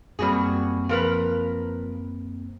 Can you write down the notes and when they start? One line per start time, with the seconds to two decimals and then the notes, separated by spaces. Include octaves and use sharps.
0.19 F#2 G3 A#3 C4 F#4 G#4
0.89 F3 A#4 B4